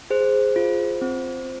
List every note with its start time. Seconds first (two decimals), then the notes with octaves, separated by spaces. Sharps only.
0.10 G#4 C5
0.56 F4
1.01 C4